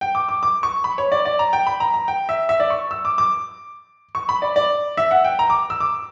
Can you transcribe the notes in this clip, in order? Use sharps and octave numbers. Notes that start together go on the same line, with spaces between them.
G5
D6
D6
D6
C#6
B5
C#5
D5
D5
A#5
G5
B5
A#5
A#5
G5
E5
E5
D5
C#6
E6
D6
D6
C#6
B5
D5
D5
E5
F#5
G5
A#5
D6
E6
D6